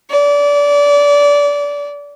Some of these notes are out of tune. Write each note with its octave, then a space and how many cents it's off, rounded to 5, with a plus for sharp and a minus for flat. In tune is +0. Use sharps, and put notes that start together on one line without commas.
D5 -25